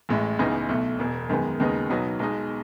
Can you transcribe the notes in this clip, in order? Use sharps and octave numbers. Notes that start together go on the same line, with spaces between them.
A1 A2 G#3
C#2 C#3 E3 B3 D#4
B1 B2 A3
E1 E2 B2
F#2 D#3 G#3 B3
D#2 C#3 G#3 B3 D#4
B1 B2 F#3 B3 D#4
B1 B2 G#3 D#4